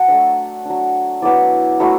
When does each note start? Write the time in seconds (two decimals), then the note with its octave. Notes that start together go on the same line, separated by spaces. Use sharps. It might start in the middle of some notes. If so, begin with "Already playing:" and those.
Already playing: F#3 F#5 A5
0.08 A3 D4 E5
0.65 F#3 D4
1.22 F#3 B3 E4 D5
1.80 F#3 A3 E4